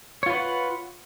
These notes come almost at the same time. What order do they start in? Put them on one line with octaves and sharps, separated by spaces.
C#5 F4 B4 F#5